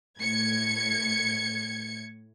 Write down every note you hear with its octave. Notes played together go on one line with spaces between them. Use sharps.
A2 G#6 C#7